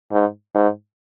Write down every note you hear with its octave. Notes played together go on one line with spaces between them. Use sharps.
G#2
G#2